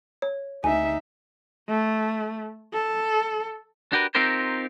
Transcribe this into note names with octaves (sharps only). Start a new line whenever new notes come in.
C#5
D2 D#4 E5 G#5
A3
A4
D4 F#4 G4 A#4 B4
C4 D#4 F4 G4 A#4 C5